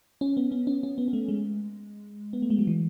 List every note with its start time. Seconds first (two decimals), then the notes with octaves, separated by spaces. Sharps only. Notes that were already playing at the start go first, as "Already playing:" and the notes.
0.21 C#4
0.37 B3
0.52 B3
0.67 C#4
0.83 C#4
0.98 B3
1.08 B3
1.13 A3
1.28 G#3
2.33 B3
2.42 A3
2.50 G#3
2.59 F#3
2.67 E3